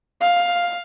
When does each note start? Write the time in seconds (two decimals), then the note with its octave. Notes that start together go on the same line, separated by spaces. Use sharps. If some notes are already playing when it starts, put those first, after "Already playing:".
0.21 F5